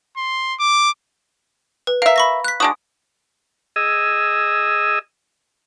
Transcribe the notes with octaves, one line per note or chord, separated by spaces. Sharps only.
C6
D6
B4
A#4 E5 F5 A#5
B5 C#6 A#6
F#6 B6
G#3 D4 F#4 D#6
G#4 D#5 E6